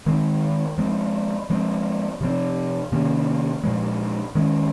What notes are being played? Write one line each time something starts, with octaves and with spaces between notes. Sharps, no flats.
D#3 G#3 C4
F3 G#3 C4
F3 G#3 C4
C3 F3 C4
C3 D#3 A#3 C#4
A#2 F3 G#3
D#3 G#3 C#4